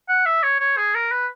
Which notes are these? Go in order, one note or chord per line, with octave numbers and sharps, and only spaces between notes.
F#5
E5
C#5
C#5
G#4
A#4
B4